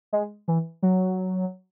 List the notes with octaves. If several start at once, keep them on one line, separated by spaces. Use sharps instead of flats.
G#3
E3
F#3